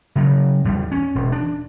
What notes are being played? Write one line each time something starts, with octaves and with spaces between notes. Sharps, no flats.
C#3 F#3
E2 G3
C#4
E1
D4